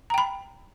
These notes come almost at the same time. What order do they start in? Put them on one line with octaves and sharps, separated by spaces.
A#5 G5 B5